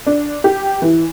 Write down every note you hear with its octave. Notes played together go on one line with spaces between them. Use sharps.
D4
G4
E3